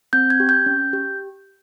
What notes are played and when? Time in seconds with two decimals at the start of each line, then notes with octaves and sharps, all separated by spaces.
0.13 C4 G6
0.30 G#6
0.40 G4
0.49 G6
0.66 C#4
0.93 G4